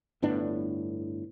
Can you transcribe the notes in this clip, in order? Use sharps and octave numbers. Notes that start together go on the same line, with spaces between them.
G1 A2 B3 D4